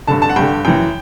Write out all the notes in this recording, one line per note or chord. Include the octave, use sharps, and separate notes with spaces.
G2 D3 A5
A5
F#5
G2 D3 G5
F#2 E3 G5